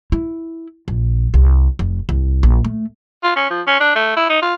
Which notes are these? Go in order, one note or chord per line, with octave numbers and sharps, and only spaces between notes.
E4
A#1
C2
F1
C2
A#1
A3
F4
C#4
F3
C#4
D4
A3
E4
D#4
F4